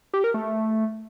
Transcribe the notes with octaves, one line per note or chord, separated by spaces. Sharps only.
G4
A#4
A3